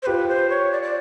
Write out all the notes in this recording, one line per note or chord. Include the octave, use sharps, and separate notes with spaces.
C5
F4 G4 B4
C5
C#5
D5
D5